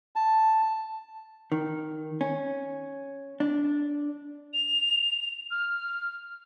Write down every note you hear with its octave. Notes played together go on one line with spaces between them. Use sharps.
A5
D#3
C#4
D4
F7
F6